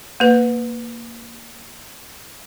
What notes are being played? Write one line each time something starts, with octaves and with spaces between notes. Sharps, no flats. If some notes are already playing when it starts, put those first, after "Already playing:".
A#3 B4